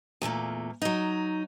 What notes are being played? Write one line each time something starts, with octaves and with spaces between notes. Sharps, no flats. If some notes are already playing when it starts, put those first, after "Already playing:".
E2 A#2 A3 A#3
F#3 D#4